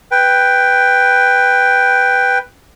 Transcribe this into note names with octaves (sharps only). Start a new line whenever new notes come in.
B4 G5